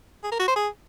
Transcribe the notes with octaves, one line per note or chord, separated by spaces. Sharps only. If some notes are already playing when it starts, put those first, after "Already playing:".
G#4
A#4
F#4
C5
G#4